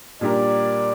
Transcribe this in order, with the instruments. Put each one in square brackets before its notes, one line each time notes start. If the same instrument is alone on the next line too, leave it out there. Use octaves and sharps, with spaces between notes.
[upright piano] A#2 G3 D4 G4 A#4 [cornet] D5